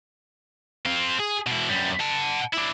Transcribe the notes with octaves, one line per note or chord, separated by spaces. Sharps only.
C4 F4
G#4
B2 E4
F#2 G3
F#5 A5
D4 E4